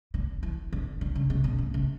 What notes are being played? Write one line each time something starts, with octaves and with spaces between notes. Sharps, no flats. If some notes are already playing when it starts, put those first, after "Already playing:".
D3
E3
D3
D3
C#3
C#3
B2
A2
C#3